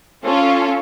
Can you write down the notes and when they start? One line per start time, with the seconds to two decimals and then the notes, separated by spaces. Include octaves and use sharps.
0.25 C#4 F4 A4